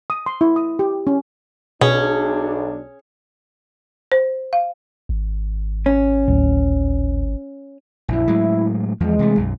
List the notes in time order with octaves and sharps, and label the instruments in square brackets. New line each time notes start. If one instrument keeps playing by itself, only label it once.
[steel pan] D#6
C6
E4
D#6
G4
C#4
[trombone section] B1 D4 [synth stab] B2 [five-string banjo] C#4 [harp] G#4
[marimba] C5
F5
[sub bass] G#1
[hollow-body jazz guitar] C#4
[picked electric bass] D1
[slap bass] A#1 F#2 [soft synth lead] E4
[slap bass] A2 F#3 G#3
[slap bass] E2 F3 [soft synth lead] G#3
[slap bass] C3 E3 A3
B1 F#2